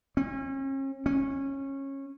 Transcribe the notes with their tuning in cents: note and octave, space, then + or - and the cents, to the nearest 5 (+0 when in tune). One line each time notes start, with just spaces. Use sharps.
C#4 -40
C#4 -20